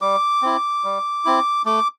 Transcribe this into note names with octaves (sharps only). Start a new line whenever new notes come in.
G3 D6
C4 E4
G3
C4 E4
A3 D6